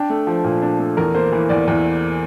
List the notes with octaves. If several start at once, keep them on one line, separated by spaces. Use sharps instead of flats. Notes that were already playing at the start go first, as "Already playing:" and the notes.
Already playing: D4 G5
A3
F3
A#2
D4
A3
E2 A#4
A#3 C5
E3
E2 D5
E2 A#4